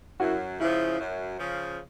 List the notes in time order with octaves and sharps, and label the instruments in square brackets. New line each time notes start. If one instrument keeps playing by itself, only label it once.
[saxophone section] F#2 [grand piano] E4 F#4
[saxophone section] C#3 F3 [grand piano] E4
[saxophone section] F#2
C#3 F3